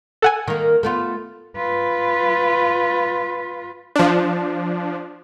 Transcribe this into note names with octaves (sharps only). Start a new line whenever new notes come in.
A4 F#5 G#5
D#3 A#3
A3 B3 F4
F4 B4
F3 D4